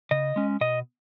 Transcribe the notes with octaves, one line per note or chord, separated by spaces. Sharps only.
C#3 D#5
G#3 C#4
B2 D#5